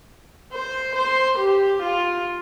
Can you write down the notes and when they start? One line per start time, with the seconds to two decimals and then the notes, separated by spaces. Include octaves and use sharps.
0.52 C5
0.96 C5
1.39 G4
1.83 F4